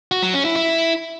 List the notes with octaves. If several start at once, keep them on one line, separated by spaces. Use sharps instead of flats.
F#4
F#3
C#4
E4
E4